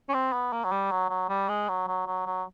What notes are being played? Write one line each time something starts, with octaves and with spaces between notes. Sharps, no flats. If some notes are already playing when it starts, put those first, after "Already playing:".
C#4
C4
B3
A#3
F#3
G3
F#3
F#3
G3
G#3
F#3
F#3
F#3
F#3